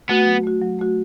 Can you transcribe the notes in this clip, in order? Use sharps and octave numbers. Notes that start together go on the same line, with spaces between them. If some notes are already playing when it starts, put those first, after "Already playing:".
A3 B3 F#4
F#3
A3 F#4
F#3
A3 F#4